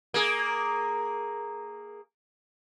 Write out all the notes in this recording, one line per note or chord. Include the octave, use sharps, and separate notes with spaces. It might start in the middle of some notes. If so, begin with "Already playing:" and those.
A#3 G#4